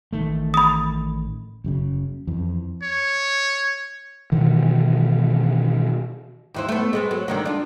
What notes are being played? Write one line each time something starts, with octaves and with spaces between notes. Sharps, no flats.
A1 D#3 A3
B5 D#6
F#1 F#2 C#3
F2 E3
C#5
B2 D#3 E3
D#2 E3 C5
A3 B3
G#3 B3 C4
F#3
D3 D#3 A#3
D4 F4